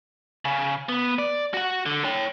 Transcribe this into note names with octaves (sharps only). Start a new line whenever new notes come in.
C#3
B3
D5
F#4 F#5
D3
C#5 G5